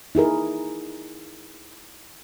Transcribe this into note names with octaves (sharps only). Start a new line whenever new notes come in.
D#4 E4 G#4 A#4